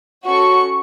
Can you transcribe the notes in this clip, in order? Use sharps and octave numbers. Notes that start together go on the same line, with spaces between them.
C#4 F#4 A4 C#6